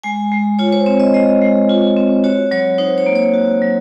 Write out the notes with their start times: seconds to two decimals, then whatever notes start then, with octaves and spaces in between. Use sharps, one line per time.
0.03 G#3 G#5
0.32 G#3
0.59 F4 C#5
0.72 C5
0.86 C4 C#5
1.00 D#5
1.14 G#3 D#5
1.42 G#3
1.69 F4
1.97 C4
2.24 F#4 C#5
2.51 F#3 C#5
2.78 D#4 C5
2.98 C#5
3.06 A#3
3.15 C#5
3.34 F#4
3.62 F#3